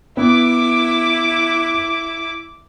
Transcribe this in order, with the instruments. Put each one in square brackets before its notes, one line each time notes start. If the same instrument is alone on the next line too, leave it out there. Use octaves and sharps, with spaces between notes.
[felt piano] B3 [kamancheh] E4 D6